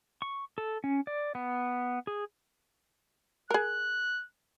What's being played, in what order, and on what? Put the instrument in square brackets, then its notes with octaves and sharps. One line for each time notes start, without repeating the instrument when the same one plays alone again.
[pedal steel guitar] C#6
A4
C#4
D5
B3
G#4
[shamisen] G#4 A#4 [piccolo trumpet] F#6